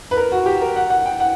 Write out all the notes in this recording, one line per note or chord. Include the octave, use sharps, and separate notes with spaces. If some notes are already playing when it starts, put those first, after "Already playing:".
B4
A#4
F#4
G4
A#4
F#5
F#5
G5
F#5